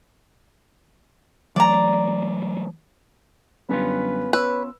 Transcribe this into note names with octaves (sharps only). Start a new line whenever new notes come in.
E3 F#3 A3 D5 A#5
F#2 D3 G3 B3 C#4 F4 B4
B4 C#5 E6